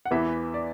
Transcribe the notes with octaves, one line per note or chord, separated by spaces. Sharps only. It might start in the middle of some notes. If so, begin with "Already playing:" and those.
F#5
E2 E3 B3 E5
D5